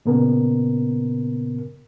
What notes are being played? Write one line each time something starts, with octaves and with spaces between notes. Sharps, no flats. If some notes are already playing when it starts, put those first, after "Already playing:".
A#2 C#3 B3 A#4